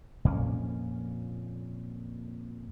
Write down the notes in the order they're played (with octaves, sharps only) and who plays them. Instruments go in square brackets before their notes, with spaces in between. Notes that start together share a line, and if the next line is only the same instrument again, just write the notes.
[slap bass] F2 A#2 A#3 C#4